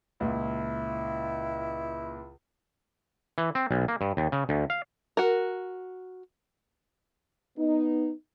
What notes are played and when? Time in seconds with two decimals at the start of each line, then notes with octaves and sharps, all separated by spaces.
0.20 C#2 A#2 E4
3.38 E3
3.55 C4
3.71 B1
3.88 A#3
4.01 G2
4.17 D#2
4.32 C#3
4.49 D2
4.70 F5
5.17 F#4 A#4
7.58 B3 D#4